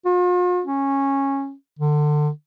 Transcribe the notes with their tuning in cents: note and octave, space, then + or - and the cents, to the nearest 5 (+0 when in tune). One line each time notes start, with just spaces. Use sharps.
F4 +45
C#4 -15
D3 +25